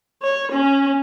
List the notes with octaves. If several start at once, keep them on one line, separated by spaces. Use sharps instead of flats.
C#5
C#4